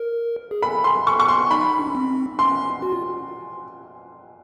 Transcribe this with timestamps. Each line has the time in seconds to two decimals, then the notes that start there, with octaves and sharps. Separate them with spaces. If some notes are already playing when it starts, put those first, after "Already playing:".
Already playing: A#4
0.51 G#4
0.62 A4 B5
0.84 C6
1.07 A4 C#6
1.20 C#6
1.28 C6
1.50 D#4 B5
1.79 D4
1.87 C#4
1.95 C4
2.39 C#4 C6
2.82 F#4
2.92 F4